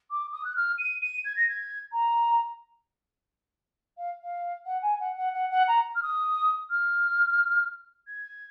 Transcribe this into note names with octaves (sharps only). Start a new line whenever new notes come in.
D6
D#6
F#6
F6
D#7
D#7
G#6
A#6
G#6
A#5
F5
F5
F#5
G#5
F#5
F#5
F#5
F#5
A#5
F6
D#6
F6
G#6